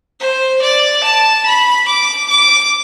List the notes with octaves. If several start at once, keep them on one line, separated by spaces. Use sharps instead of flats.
C5
D5
A5
B5
D6
D6